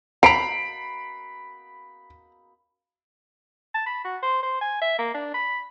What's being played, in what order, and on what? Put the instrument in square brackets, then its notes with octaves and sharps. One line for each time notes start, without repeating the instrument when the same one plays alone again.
[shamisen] G#5 A#5 [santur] B5 [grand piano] C7 D7
[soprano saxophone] A5
B5
F#4
C5
C5
G#5
E5
A#3
D4
B5